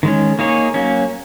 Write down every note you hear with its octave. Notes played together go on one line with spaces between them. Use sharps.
D#3 G#3 C#4
A#3 D#4 G#4 C#5
F#3 A#3 C#4